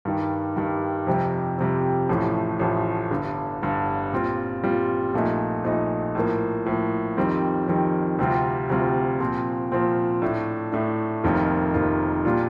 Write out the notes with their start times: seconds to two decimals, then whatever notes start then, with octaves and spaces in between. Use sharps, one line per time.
0.05 G2 D#3 G3
0.56 G2 D#3 G3
1.07 F2 C3 G3
1.58 F2 C3 G3
2.09 A1 A2 F3 A3
2.59 A1 A2 F3 A3
3.11 G1 G2 D3
3.62 G1 G2 D3
4.12 A#2 G3 C4 F4
4.63 A#2 G3 C4 F4
5.14 A#1 A#2 A3 D#4
5.64 A#1 A#2 A3 D#4
6.15 A2 F3 A#3
6.66 A2 F3 A#3
7.17 F2 D#3 G3 C4
7.68 F2 D#3 G3 C4
8.18 D2 C3 G3 C4 F4
8.69 D2 C3 G3 C4 F4
9.20 A#2 F3 C4
9.72 A#2 F3 C4
10.22 A2 A3 D4
10.72 A2 A3 D4
11.23 F1 F2 D#3 A#3 F4
11.74 F1 F2 D#3 A#3 F4
12.25 A#2 G3 D4 F4